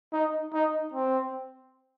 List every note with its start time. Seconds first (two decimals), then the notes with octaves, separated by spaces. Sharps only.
0.13 D#4
0.53 D#4
0.93 C4